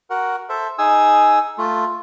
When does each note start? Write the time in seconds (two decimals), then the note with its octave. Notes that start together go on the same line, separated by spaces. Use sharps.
0.10 F#4 A#4 F#5
0.49 A4 C5 E5
0.78 D#4 G#4 G#5 D#6 E6
1.58 A3 F4